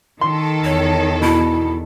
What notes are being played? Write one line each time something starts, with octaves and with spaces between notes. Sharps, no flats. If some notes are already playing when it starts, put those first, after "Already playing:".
D#3 A4 C6
E2 C#5
B2 E4